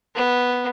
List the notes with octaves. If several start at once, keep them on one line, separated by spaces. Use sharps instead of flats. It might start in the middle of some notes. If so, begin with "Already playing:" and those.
B3